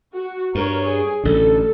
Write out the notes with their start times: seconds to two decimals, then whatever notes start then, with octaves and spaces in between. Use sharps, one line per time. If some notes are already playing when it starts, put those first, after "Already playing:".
0.14 F#4
0.55 G2 A#4 C#5
0.86 G#4
1.24 A1 D3 A4